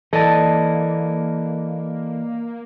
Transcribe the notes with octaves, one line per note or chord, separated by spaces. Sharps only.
E3 A#3 A4 D5 D#5 A5